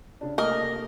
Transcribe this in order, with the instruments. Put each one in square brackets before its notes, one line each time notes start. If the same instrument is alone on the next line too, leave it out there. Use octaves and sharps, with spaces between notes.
[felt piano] C#3 D4
[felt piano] C3 A3 A#3 [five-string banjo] A#4 D#5